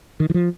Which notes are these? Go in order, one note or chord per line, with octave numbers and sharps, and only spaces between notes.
D#3
E3
F3